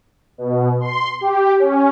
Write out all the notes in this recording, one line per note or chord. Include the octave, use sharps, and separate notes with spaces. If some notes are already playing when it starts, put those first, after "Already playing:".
B2
C6
G4
C#4